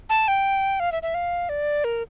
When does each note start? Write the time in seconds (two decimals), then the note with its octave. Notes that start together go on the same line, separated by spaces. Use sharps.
0.10 A5
0.28 G5
0.80 F5
0.92 E5
1.03 E5
1.14 F5
1.49 D5
1.84 A#4